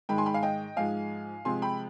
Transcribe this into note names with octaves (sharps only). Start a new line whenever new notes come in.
G#2 D#3 G#3 G5 B5
G#5 C6
G5 B5
F5 G#5
D#5 G5
G#2 F3 G#3 F5 G#5
C3 F3 G#3 G#5 C6
G5 B5